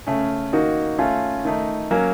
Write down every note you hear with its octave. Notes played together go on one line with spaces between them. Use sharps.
C#3 A3 C#4
D#3 A#3 D#4 F#4
A3 C#4 F4
D#3 A3 D#4
F#3 A#3 C#4